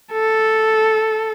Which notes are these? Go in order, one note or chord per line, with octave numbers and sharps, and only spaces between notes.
A4